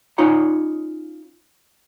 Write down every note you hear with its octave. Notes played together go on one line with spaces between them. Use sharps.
C#4 D#4 F4 C#5 A#5